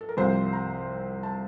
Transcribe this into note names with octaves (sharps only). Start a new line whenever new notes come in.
A4
A#4
C2 C3 F3 C5
A#5
A5